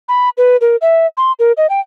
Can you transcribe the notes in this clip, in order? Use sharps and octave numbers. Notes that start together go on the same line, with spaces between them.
B5
B4
A#4
E5
C6
A#4
D#5
G5